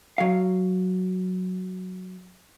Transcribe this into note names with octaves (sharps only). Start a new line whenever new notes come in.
F#3 F5